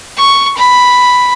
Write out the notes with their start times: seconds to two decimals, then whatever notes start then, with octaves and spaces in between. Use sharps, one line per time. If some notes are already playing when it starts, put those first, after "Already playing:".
0.17 C#6
0.56 B5